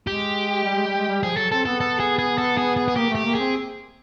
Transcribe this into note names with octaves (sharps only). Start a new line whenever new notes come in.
G#3 G4
G3
G#3
G3
G#3
G3
F3 G#4
F#3 A4
C4 A4
B3 A4
A4
G#4
G#4
A4
G#4
G#4
G#4
A#3 G4
A3 G4
A#3
C4 G#4